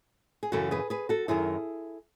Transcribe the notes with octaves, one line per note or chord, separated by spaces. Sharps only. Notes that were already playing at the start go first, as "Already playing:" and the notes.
G#4
F#2 C#3 E3 F#4 A4
G#4 B4
G#4 B4
F#4 A4
F#2 D#3 E4 G#4